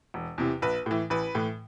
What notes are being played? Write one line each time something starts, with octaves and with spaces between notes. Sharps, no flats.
E1
E2 C3 E3
A#1 B4
A2 E3
A1 B4
A2 E3